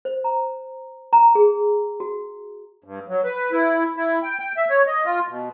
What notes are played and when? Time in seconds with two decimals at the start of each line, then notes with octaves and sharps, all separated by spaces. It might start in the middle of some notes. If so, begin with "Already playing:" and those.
0.05 C5
0.24 A#5
1.13 A#5
1.35 G#4
2.00 F#4
2.84 G2
3.08 F#3
3.24 B4
3.52 E4
3.96 E4
4.23 G5
4.39 G5
4.57 E5
4.70 C#5
4.87 D#5
5.05 F4
5.28 B2